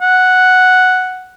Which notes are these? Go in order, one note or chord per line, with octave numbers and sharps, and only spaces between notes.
F#5